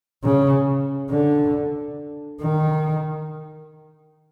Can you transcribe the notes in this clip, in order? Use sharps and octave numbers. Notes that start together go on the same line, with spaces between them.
C#3
D3
D#3